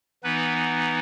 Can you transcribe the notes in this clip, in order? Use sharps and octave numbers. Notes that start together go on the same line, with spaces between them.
E3 B3 D#4 B4